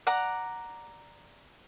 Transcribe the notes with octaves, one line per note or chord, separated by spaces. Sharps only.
D5 F#5 A#5